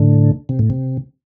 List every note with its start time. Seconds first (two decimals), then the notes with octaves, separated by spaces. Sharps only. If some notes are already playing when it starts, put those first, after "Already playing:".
Already playing: A2 D3
0.49 C3
0.59 A2
0.70 C3